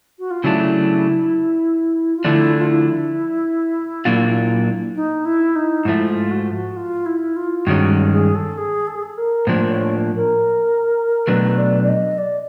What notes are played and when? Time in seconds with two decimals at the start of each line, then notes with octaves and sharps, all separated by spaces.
0.19 F#4
0.31 F4
0.44 C#3 F#3 A3 D4 E4
2.16 F4
2.24 D3 F3 A3 D4 E4
2.61 F4
2.70 E4
4.05 A#2 F#3 A#3 D4 F4
4.95 D#4
5.25 E4
5.55 D#4
5.85 G#2 F3 A3 E4
6.09 F4
6.31 F#4
6.53 F#4
6.76 F4
7.06 E4
7.36 F4
7.66 G2 D#3 G#3 C#4 F#4
8.12 G#4
8.35 A4
8.57 G#4
8.87 A4
8.95 G#4
9.02 A4
9.17 A#4
9.47 A2 F3 A#3 D4 C5
9.70 C#5
10.15 A#4
11.27 B2 F#3 A3 D4 B4
11.58 D5
11.83 D5
11.88 D#5
12.18 D5